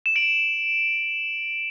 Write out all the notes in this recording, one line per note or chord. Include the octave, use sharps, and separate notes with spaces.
E7
D7 F#7